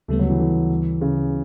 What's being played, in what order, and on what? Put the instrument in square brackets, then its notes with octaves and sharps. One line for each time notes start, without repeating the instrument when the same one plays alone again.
[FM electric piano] D2 C#3 G3 B3 [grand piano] A3
[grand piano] F#3
E3
E3
C#3